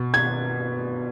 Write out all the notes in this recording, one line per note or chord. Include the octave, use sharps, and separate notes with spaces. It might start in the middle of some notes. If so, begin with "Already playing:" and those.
Already playing: B2
G#6